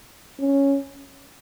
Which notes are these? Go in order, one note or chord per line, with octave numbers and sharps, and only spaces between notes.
C#4